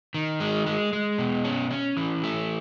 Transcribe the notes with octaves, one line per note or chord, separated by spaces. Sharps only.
D#3
G#3
G#3
G#3
B2
C#4
C#4
E3
A3